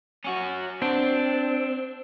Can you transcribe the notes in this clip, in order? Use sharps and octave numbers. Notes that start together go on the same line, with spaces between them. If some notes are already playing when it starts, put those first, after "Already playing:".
C#4 F#4
C4 D4